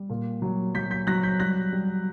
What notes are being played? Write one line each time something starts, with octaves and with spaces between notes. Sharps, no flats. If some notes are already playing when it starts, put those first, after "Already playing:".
Already playing: G3
A#2
F#3
F#3 G6 B6
G6 B6
F#3 F#6 A#6
G6 B6
G3 F#6 A#6
G3